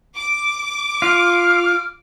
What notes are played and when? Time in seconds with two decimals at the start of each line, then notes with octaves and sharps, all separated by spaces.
0.15 D6
1.02 F4 F6